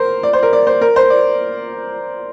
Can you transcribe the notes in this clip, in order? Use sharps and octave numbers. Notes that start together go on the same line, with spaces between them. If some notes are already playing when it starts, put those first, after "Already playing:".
Already playing: A#4 C5
D5
C5
A#4
D5
C5
A#4
C5
D5